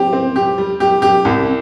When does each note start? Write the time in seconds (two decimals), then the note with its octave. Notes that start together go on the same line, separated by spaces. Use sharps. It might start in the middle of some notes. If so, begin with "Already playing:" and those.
Already playing: C4 G4
0.13 C4
0.36 G4
0.58 G3
0.80 G4
1.02 G4
1.25 C2